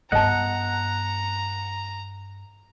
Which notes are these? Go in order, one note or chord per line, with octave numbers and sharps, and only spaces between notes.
G2 B3 D#5 F#5 A5 A#5